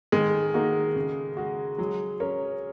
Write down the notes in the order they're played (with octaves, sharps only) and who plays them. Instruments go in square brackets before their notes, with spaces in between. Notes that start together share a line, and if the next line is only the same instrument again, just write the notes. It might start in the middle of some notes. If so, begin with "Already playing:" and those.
[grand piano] D#3 [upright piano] G#3
[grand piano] G#3 D#4 F#4 [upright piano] A#3
[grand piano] C#3
G#3 F#4
[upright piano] F#3 [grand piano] G#3
[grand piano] C#4 A#4 C#5